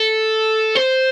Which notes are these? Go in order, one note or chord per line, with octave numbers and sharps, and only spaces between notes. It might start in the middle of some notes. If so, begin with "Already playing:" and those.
Already playing: A4
C5